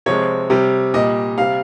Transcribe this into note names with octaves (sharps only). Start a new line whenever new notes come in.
C3 F3 G#3 C#5
C3 G3
A#2 G3 D#5
C3 G3 F5